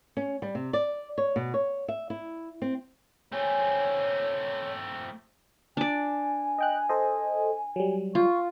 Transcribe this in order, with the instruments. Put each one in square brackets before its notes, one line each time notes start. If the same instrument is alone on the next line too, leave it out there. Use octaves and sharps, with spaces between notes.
[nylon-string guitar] C#4
G3
C3
D5
C#5
B2
C#5
E5
E4
C4
[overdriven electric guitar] A3 C4 [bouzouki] G#4 G#5 [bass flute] C#5
[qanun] D4 D5 [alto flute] G#5
[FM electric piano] D#5 G5 F#6
A4 C5 D#5
F#3 G3
[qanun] F4 [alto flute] C#6